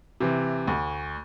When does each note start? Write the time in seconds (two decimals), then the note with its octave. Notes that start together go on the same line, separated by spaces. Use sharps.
0.20 C3 E3
0.67 D2